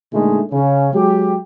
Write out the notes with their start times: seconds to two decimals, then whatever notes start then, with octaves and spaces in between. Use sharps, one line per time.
0.13 A#2 D3 G#3 A3 D#4
0.52 C#3 C#4
0.94 F#3 G#3 G4